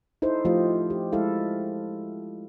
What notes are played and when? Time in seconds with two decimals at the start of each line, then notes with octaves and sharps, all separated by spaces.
0.22 D#4 E4 A4 C5
0.45 F3 A3 F4 G4 D#5
0.90 G4
1.12 G#3 E4 A4 F5